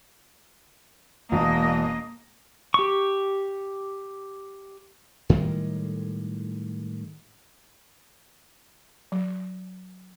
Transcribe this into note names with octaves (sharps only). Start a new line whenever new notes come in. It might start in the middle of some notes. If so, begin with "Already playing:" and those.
E1 A#3 D#5
G4 C#6
A2 D#3 G3 G#3
F#3